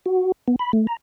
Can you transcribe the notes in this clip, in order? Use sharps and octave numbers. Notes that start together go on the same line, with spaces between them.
F#4
B3
B5
A3
A#5